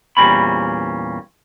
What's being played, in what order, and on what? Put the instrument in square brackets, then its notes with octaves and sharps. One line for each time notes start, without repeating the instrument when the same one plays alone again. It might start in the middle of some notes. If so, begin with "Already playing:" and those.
[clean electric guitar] E2 A#2 G3 C4 C#4 B5